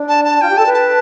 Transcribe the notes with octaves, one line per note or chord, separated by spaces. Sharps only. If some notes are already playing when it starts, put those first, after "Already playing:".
Already playing: D4
A5
A5
F4 G5
G4
A4 A5
B4
A5